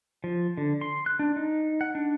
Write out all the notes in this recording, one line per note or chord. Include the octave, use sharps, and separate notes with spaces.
F3
D3
C6
F#6
D4
D#4
F#5
D4